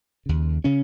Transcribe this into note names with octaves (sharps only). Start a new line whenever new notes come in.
D#2 C#3
C#3 C#4